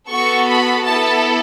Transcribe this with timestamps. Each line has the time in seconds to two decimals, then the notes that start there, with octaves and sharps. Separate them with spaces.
0.10 B3 F#4 A4 C#6
0.48 B5
0.87 B3 E4 A4 A5